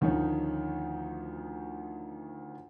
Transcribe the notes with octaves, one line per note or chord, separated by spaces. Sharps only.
D2 D#3 F3 C#4 D#4 C#5